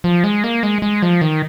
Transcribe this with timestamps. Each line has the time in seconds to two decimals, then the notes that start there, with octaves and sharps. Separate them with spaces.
0.04 F3
0.24 G#3
0.44 A#3
0.63 G#3
0.82 G#3
1.02 F3
1.21 D#3